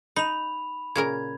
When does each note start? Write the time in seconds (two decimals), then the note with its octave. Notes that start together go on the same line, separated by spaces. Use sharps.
0.16 D#4 B5 F7
0.96 A#2 C#3 A#4 G#6